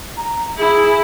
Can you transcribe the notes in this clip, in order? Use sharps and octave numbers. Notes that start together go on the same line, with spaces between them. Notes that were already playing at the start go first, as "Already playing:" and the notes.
A#5
E4 G#4